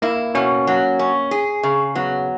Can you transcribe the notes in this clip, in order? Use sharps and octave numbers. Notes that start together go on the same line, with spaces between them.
A#3 E4
B2 C#4
F#3
C#4
G#4
C#3
F#3 B3